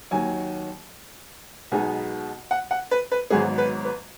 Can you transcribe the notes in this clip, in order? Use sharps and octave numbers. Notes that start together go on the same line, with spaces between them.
D#2 D#3 F#3 G#5
B1 B2 G#3 B3 D#4 G#5
F#5
F#5
B4
B4
G#1 G#2 F#3 B3 G#4
B4
B4